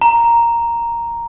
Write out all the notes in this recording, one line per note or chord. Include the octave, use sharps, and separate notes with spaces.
A#5